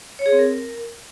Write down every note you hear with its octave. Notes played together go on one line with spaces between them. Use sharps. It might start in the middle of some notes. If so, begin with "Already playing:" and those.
C#5
G#4
C4
A#4